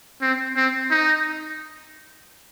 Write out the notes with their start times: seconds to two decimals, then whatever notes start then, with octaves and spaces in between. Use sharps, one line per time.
0.21 C4
0.56 C4
0.91 D#4